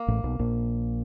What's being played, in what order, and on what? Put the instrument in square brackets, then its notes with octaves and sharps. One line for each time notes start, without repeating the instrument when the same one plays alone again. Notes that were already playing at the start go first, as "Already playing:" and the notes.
Already playing: [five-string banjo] A#3
[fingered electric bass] A1 A2
B1 B2
A#1 A#2